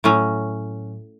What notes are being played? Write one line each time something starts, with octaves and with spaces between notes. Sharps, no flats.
A2 F#3 C#4